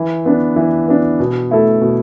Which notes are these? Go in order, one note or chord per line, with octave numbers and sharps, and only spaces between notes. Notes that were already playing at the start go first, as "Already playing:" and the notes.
Already playing: E3
B3 D4
E3
B3 D4
B2
A3 E4 A4
B2